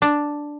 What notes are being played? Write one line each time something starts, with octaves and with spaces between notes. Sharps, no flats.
D4